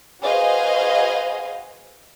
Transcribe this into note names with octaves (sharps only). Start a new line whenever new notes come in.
F#4 G#4 B4 C5 D#5 F5